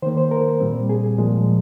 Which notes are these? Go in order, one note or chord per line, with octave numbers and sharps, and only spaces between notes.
D#3 A#3 C5
C5
A#4
A#2 G3 C4
G#4
A#2 F3 G#3